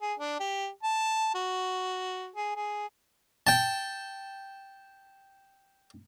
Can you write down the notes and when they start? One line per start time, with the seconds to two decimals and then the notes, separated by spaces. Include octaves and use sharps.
0.02 G#4
0.19 D4
0.40 G4
0.83 A5
1.35 F#4
2.36 G#4
2.56 G#4
3.47 G5 A5